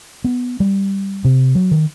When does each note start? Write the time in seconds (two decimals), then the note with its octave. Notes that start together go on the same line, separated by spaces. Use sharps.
0.24 B3
0.60 G3
1.25 C3
1.55 F#3
1.71 D#3